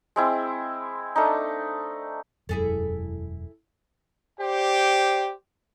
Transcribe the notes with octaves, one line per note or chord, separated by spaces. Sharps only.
G#3 C4 E4
A3 D4 D#4
E1 F#2 E4 G#4 A4
G4 C5 D5 G5